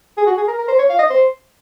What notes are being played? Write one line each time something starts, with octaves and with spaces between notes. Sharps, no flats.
G#4
F#4
G#4
A#4
A#4
C5
C#5
F5
D#5
C5